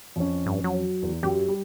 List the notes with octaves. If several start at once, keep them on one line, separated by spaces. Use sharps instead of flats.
F2 C#4
G2
F#3
E2
F#2 G4
G3